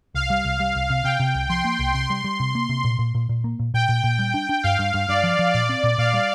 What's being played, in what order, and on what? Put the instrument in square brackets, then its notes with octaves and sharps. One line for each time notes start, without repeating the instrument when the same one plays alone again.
[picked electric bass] C2 [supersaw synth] F5
[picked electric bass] G3
C2
G3
C2
C3
[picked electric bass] C3 [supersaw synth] G5
[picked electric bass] C3
C2
[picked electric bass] F3 [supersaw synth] C6
[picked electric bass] A#3
C2
[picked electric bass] C3 [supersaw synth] C6
[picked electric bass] G3
G3
C3
A#3
C3
A#2
A#2
A#2
A#2
A#3
A#2
[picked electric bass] A#2 [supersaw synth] G5
[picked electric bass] A#2
A#2
G3
D4
D4
[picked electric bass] G2 [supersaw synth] F5
[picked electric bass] G2
G2
[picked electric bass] G2 [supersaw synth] D5
[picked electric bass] F3
F3
[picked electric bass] A#2 [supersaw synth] D5
[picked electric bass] C4
A#2
[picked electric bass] A#2 [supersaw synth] F5
[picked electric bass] G3